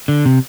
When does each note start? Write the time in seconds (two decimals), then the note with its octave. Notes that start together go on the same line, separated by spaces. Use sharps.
0.08 D3
0.26 C3